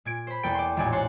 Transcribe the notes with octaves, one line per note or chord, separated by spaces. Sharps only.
A#2 G#6 D7
C5 B5
E2 B2 A#3 A4 G5 D7
D5 C6
E1 A1 A#2 A4 D5 G#5
C5 C#5 F#5 A5 C6